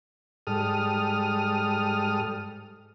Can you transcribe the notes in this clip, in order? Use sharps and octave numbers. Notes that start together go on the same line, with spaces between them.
G#2 G3 A4 D#6 F6